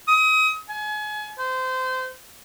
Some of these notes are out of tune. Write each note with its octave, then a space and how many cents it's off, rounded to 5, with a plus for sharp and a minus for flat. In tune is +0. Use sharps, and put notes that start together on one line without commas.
D#6 +30
G#5 +35
C5 -25